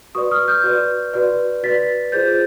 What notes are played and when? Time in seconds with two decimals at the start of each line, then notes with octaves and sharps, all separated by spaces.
0.15 F#4 B4 D5 C#6 D#6
0.31 D#6 F6
0.48 F6 G6
0.64 F#4 B4 D5
1.14 F#4 B4 D5
1.63 F#4 B4 D5 A6 B6
2.12 F4 G#4 C5 G6 A6